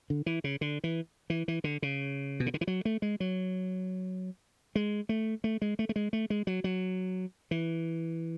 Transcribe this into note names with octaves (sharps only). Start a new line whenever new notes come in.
D3
E3
C#3
D3
E3
E3
E3
D3
C#3
B2
C#3
D3
E3
F#3
A3
G#3
F#3
G#3
A3
A3
G#3
A3
A3
G#3
A3
G#3
F#3
F#3
E3